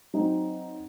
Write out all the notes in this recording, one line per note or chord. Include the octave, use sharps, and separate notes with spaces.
F#3 C4 D#4